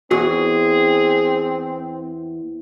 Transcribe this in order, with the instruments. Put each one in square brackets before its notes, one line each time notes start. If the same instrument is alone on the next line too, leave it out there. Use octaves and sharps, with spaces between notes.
[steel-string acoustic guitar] E2 [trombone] C4 [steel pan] F#4 [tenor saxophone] G#4